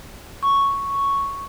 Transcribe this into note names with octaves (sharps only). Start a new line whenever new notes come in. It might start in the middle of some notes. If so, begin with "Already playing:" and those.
C#6